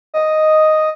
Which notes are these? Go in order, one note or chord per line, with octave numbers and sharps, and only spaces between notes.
D#5